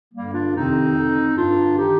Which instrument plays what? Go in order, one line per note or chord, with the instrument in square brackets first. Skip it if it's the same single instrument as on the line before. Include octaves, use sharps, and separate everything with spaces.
[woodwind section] G2 D3 G3 A#3
D4 F4
F2 C3 D#3 C4 D#4
F2 D3
G2 D3 D4 F4
D#3 D#4 G4